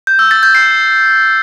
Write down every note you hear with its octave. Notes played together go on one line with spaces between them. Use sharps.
G6
E6
A6
G6
C7